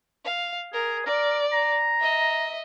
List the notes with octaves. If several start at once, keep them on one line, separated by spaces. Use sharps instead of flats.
F5
G#4 A#4
A#4 D5
A#5
D#5 E5